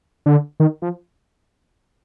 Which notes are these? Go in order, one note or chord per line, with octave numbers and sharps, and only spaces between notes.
D3
D#3
F3